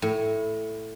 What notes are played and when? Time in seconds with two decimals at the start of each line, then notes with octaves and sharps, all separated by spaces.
0.02 A2